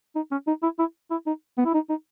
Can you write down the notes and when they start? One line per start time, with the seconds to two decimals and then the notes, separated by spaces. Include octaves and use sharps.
0.16 D#4
0.32 C#4
0.47 D#4
0.63 E4
0.79 E4
1.11 E4
1.27 D#4
1.58 B3
1.66 E4
1.74 D#4
1.89 D#4